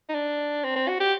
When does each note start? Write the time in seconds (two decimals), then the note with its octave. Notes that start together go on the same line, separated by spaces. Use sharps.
0.09 D#4
0.14 D4
0.64 C4
0.76 C4
0.88 F#4
1.00 G4